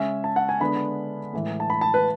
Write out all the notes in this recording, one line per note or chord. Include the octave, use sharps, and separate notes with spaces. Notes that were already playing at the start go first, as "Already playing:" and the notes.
Already playing: C#3 G#3 C#4 E5
A5
F#5
G#5
D3 G#3 B3 D4 B5
A2 E3 G#3
A5
B5
A5
B4